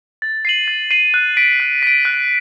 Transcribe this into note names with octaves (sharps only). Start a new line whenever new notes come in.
A6
C7 D#7 F#7
A6
C7 D#7 F#7
F#6
B6 D7
F#6
B6 D7
F#6